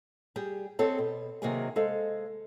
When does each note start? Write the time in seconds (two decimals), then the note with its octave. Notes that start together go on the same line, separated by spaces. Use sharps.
0.36 G3 G4 G#4
0.79 C4 G#4 A4 C#5 D#5
0.99 B2
1.42 C3 D#3 F#3 A#3 G#4 G#5
1.76 G#3 A4 C5 F5